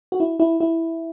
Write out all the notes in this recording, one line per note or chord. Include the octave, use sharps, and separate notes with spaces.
F#4
E4
E4
E4